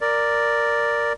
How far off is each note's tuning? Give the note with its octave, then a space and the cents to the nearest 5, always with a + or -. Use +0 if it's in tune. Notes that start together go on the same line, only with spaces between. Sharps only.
A#4 +0 D5 +0